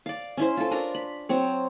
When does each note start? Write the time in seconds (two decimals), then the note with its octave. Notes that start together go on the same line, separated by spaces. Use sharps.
0.06 D5 F5
0.37 C#4 E4 C5
0.57 F4 A4
0.71 D4 A#4 A#5
0.95 B5
1.29 F#3 C4 C#5